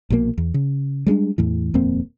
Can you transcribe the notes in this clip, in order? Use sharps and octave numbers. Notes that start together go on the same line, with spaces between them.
A#1 B2 F3 A#3
E2
C#3
G3 G#3 C#4 D4
E2 A2 E3
D#1 F2 A#3 C4